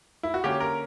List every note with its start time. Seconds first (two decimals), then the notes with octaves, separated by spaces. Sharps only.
0.23 E4
0.34 F#4
0.44 D3 A#3 C#4 G4
0.60 A#4